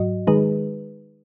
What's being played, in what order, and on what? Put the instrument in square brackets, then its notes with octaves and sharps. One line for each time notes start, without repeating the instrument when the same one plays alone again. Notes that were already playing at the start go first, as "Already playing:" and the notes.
Already playing: [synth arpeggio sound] G#2 F#3 F#4 D#5
D#3 G#3 D#4 G#4 B4